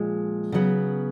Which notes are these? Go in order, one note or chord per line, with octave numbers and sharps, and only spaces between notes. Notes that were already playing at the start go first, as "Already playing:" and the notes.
Already playing: A#2 F3 G#3
C#3 F#3 B3